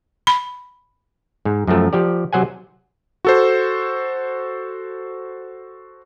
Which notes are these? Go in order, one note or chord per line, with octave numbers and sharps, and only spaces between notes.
B5
G#2
F#2 F3 A3
F3 G4 D5
C3 F#3 C5 F#5 G#5
F#4 A4 C5